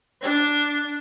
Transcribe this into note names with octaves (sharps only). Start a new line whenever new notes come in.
D4